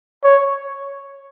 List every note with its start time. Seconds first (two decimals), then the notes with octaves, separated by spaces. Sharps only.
0.24 C#5